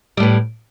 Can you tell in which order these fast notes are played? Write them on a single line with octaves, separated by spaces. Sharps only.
G3 A2 B3